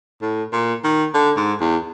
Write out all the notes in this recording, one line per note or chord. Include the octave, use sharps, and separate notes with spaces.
A2
A#2
D#3
D3
G#2
E2